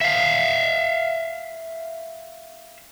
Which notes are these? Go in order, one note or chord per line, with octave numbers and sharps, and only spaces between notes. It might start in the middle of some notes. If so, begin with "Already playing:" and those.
E5 F5